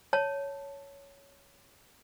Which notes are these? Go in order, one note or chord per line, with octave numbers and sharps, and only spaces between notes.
C#5 A5